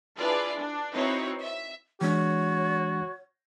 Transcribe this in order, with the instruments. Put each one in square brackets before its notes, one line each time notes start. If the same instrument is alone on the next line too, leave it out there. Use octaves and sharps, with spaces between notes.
[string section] D4 E4 F4 G#4 B4 D5
D4
C4 D#4 E4 F#4 B4 C#5
E5
[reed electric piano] E3 G#3 D4 [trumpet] F#4 [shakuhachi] C#5